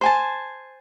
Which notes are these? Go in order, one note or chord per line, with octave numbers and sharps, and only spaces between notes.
C5 G#5 A5